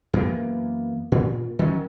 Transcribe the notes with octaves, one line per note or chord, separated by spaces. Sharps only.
F#2 E3 A#3 B3
A#2
D#3 F#3 C#4